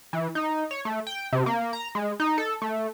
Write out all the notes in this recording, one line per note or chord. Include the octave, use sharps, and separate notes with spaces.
E3
D#4
C#5
A3
G5
C3
A#3
A#5
G#3
D#4
A4
A3